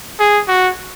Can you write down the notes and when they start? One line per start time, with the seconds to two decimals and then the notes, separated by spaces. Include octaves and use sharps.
0.20 G#4
0.48 F#4